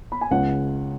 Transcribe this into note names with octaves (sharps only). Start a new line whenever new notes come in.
B5
G#5
C#2 C#3 G#3 F#5